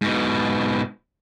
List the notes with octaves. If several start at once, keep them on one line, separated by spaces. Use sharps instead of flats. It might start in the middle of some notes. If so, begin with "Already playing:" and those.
G#2 B2